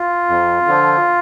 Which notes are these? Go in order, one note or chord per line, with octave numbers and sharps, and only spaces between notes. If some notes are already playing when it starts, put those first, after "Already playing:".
Already playing: F4
F2
D3 F3